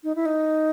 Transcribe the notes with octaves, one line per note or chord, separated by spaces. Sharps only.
D#4
E4
D#4